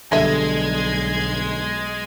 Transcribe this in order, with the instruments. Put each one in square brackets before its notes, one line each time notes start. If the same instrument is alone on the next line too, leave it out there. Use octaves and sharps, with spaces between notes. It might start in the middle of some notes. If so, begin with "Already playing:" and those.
[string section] B1 G#6 C7 [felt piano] D3 G3 [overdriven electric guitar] G#3 [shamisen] G#4 E5